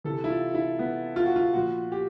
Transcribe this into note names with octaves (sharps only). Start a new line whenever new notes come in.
C3 E3 A4
E4
F4
E4
B3
F4
F#4
F4
A#2 F3 F#4
G4